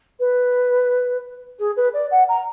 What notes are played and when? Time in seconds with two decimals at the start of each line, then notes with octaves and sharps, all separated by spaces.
0.20 B4
1.59 G#4
1.76 B4
1.94 D5
2.11 F#5
2.29 A#5